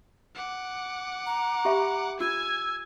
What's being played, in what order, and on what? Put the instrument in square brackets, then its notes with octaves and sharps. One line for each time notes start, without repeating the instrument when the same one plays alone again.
[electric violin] F#5 D6
[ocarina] A#5
[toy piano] G4 E5 B5
[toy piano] F4 [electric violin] G#5 G#6 [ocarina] E6